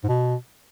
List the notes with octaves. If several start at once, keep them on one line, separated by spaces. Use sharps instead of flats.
G#2
B2